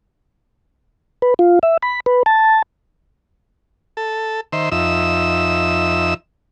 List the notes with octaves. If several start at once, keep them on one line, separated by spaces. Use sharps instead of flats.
B4
F4
E5
B5
B4
A5
A4
D#3 C5 E5
F2 D#4 E5 E6